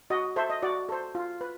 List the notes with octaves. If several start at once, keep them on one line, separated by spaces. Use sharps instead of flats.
F#4 D#5
A4 C5 E5
D#5
F#4 D5
A4 C5
F4
B4